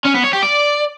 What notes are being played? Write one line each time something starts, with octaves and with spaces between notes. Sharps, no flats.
C#4
B3
C#5
G4
D5